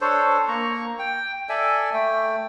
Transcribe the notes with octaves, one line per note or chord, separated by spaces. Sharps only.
D4 A4 C5 C#5
A#3 A#5 C#6
G5
A4 D5 E5 G#5
A3 G5